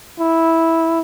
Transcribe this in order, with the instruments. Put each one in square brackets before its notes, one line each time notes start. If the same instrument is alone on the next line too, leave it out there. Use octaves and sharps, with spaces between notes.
[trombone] E4